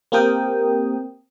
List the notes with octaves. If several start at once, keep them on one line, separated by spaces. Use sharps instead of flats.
A#3 C4 G4 A#4 G5 D#6